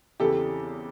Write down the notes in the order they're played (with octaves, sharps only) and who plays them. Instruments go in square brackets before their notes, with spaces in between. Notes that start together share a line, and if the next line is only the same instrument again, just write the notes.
[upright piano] E2 C#3 E3 A3 C4 [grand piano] G4 A4